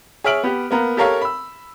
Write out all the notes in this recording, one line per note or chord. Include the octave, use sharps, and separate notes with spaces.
G#4 C#5 E5 F6 D7 F#7
B3 G4
A#3 B3 A#4
G4 A4 A#4 C#5 F5
B5 E6